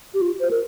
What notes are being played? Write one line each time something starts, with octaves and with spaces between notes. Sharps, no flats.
G4
F4
C5
A#4